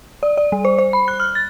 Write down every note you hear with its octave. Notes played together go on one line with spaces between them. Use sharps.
D5
D5
G3
C5
C5
B5
F#6
F6
A6